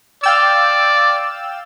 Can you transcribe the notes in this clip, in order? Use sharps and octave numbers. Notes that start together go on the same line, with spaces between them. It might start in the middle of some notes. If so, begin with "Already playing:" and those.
D5 F5 G5 E6